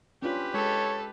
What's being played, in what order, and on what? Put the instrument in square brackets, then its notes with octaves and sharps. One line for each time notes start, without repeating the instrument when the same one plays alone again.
[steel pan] C#4 D4 F4 [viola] G4 B4
[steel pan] G#3 [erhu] A4 [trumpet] C#5